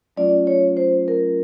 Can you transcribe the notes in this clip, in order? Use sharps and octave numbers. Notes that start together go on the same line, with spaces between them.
F#3 A3 C#4 F4 D5
C#5
C5
A#4